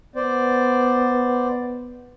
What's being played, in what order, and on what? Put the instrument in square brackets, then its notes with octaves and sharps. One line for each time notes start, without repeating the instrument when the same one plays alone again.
[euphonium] B3 [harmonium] C5 D5